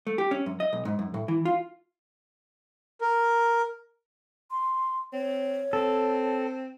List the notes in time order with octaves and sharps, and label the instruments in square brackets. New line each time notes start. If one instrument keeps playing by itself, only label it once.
[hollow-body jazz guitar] A3
G4
C#4
F#2
D#5
B1
G#2
F#2
A2
E3
F4
[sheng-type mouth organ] A#4
[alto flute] C6
[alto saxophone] C4 [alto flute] C#5
[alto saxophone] C4 [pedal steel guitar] A4